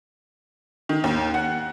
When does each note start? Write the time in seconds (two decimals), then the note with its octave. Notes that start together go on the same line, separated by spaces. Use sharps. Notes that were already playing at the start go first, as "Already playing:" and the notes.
0.89 D#3
1.04 D#2
1.34 F#5